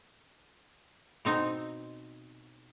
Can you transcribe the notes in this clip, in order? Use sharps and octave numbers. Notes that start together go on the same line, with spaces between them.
B2 C4 D#4